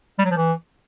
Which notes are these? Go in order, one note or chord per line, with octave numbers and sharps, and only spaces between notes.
G3
F#3
F3
E3